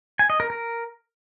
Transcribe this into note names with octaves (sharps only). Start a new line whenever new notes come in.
G#5
D#5
A#4
A#4